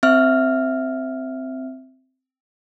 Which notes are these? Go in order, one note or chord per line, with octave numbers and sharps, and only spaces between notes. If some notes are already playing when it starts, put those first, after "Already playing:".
C4 E5 F6